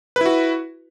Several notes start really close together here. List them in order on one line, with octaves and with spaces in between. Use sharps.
B4 E4 F#4